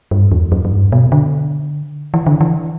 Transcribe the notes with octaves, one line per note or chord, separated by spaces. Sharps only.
G2
E2
F#2
F#2
G2
B2
D3
E3
D3
E3